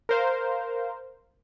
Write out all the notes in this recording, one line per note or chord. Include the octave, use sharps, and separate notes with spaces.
A#4 C5 F5